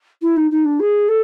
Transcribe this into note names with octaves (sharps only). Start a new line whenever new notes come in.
E4
D#4
D#4
D4
G#4
A4